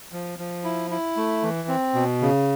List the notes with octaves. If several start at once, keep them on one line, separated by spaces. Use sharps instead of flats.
F3
F3
E4
E4
A3
E3
C4
B2
C#3